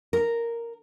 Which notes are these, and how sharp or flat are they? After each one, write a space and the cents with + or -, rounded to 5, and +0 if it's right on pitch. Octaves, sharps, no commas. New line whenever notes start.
A#4 -5